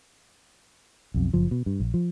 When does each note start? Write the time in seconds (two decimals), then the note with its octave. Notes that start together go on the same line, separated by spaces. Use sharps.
1.14 B1 F2
1.33 F#1 F3
1.51 B2
1.66 G2
1.80 A#1
1.94 F3